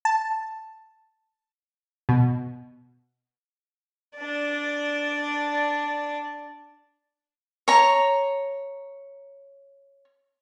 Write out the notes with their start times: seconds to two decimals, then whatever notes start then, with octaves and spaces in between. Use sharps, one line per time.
0.05 A5
2.09 B2
4.17 D4 D5
7.68 C#5 A#5